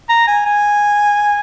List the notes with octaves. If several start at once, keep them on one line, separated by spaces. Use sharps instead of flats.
A#5
G#5
G#5